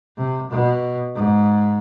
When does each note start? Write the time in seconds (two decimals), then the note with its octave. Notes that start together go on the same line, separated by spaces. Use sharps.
0.17 C3
0.50 B2
1.15 G#2